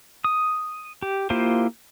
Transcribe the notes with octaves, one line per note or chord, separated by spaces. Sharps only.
D#6
G4
A#3 E4 F4 G4 C5